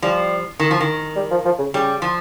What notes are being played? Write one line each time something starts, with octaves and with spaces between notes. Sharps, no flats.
F3 G3
D#3
F3
D#3
G3
F3
F3
C#3
C#3 G3
F3